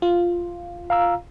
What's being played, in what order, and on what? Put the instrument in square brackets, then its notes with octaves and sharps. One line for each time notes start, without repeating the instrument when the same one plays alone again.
[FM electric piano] F4
[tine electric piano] F5 A#5 E6